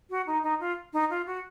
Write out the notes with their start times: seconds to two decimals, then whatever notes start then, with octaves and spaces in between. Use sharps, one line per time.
0.10 F#4
0.27 D#4
0.43 D#4
0.60 F4
0.93 D#4
1.10 F4
1.26 F#4